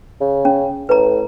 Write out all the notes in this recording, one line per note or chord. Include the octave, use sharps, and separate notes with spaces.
C#3
C#4
A2 B4 A#5